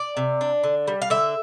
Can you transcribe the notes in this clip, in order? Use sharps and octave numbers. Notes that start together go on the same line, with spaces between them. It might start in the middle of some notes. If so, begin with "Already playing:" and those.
Already playing: D5
C3
D4
D3
G3
F5
D3 E5